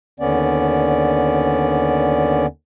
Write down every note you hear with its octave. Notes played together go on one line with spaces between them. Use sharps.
D#2 D3 B3 C#4 D5